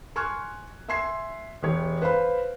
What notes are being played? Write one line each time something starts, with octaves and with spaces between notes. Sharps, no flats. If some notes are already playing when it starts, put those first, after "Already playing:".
G#5 C6 C#6 F6 F#6 G#6
E5 G#5 C6 G#6 C7
E1 G4 C#5
B4 C5 F5 B5